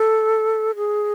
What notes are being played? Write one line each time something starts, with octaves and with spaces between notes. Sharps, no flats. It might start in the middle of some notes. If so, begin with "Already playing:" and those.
Already playing: A4
G#4